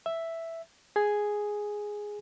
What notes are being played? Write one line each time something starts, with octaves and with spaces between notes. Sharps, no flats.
E5
G#4 G#5